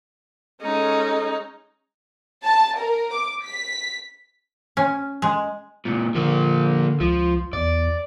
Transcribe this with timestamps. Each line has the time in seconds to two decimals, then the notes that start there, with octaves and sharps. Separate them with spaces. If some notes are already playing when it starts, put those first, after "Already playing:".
0.61 G#3 C#4 D#4 A4
2.43 A5
2.78 A#4
3.14 D6
3.43 B6
4.77 C#4
5.22 G#3
5.85 C#2 A#2
6.15 D3 F3 A#3
7.00 C#2 F3
7.53 E2 D5